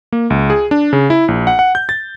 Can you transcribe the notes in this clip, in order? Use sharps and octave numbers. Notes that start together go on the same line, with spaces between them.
A#3
C#2
G#4
D4
C#3
E4
A#1
F#5
F#5
G6
A6